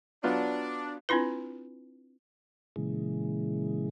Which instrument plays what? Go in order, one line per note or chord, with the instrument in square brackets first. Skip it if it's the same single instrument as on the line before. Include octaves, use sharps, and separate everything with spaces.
[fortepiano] F#3 B3 F4 [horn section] D4
[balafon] C4 D4 E4 F4 B4
[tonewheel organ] A#2 C#3 E3 G#3